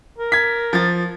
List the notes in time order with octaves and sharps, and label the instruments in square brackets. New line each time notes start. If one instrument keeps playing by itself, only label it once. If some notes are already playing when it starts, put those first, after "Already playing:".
[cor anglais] A#4
[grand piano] G#6 B6
F3 A6